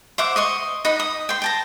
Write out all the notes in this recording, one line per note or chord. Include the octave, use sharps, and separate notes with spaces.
C5 E5 F#5 D6
D#5 C6 C#6
D#4 F#5 B5 D#6
D#6
G5 C6
G5 A5 A#5